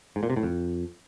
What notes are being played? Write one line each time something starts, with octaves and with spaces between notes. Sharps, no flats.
G#2
A#2
C3
A2
F2